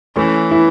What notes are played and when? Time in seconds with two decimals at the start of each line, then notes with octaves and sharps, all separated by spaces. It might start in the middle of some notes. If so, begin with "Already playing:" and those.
0.16 E3 A3 C#4
0.51 B3 E4